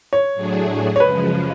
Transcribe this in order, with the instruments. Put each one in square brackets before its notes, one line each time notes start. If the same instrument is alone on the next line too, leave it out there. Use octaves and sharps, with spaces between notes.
[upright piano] C#5
[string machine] A2 F#3 A3 D4 G#4
[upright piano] C#5
[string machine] F#2 C#3 F3 G#3 [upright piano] B4